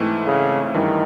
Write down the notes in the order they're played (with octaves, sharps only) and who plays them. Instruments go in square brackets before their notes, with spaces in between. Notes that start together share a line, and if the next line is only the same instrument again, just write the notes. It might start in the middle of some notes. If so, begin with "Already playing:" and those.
Already playing: [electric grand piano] G#2 E3 A3 C4 E4
[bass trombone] C#3
[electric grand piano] G2 E3 G3 [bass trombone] D#3